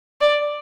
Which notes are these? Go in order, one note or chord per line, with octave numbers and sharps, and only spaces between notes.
D5